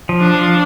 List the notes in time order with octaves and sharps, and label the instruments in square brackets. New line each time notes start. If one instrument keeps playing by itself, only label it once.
[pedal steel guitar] F3
[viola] D4
[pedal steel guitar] F3